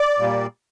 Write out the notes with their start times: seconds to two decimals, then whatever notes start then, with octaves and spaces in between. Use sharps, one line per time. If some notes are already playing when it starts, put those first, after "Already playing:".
Already playing: D5
0.19 A#2 G3 A#3